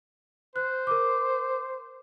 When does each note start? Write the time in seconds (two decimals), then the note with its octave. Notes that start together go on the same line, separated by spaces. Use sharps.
0.56 C5 F#6
0.87 A#4 D6